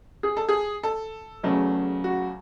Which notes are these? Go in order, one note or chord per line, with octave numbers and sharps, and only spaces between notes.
G#4
A4
G#4
A4
E2 C#3 F#3 A3
F#4